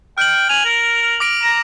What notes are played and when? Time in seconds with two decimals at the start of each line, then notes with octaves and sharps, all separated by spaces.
0.18 G5 F6 F#7
0.50 G#5 F7 F#7
0.65 A#4
1.20 D6 A#6 D7
1.43 A#5 E7